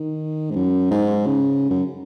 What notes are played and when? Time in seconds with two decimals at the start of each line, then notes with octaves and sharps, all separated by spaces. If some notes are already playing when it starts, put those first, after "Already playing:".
Already playing: D#3
0.51 G#2
0.56 F#2
0.91 G#2
1.26 C#3
1.70 F#2